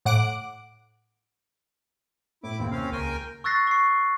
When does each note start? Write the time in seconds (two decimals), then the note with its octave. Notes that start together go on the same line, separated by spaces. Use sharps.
0.05 A2 F#5 D6 D7
2.43 A2 E4 D6
2.60 D#2 C4
2.71 C3 C4 C#4 F5
2.92 C#2 A#4 G5 G#5
3.44 C#6 E6 F#6 A6 A#6 C7
3.67 C#6 C7